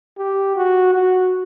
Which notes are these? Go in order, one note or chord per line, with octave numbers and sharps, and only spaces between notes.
G4
F#4
F#4